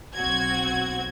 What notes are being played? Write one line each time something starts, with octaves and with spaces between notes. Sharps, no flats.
B1 C4 F#4 G#6